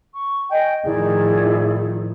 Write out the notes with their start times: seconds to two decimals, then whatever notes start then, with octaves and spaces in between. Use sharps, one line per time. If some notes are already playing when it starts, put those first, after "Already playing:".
0.13 C#6
0.51 D#5 G5 G#5
0.86 A2 D#3 F3 E4 G#4 D5